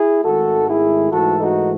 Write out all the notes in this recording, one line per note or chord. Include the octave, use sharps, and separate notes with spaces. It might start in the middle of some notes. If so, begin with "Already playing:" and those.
Already playing: E4 G#4
G#1 G#2 D#3 A3 F#4 A4
E4 G#4
G#2 E3 A3 F#4 A4
D#4 F#4